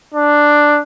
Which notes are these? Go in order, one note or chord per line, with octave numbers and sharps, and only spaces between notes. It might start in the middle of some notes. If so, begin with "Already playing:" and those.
D4